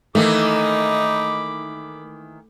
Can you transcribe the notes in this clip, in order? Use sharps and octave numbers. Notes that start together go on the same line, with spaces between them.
D#3 E3 A3 A#3 D#4 B5 D6